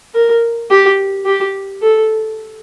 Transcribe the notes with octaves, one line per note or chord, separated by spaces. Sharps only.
A#4
G4
G4
A4